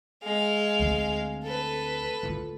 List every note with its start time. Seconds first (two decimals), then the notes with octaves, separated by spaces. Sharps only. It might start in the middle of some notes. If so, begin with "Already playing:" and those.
0.23 G#3 F5
0.80 D2 C4
1.44 A4 B4
2.23 D2 F4